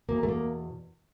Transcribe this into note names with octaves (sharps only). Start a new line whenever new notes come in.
E2 B2 A#3
A3
A#3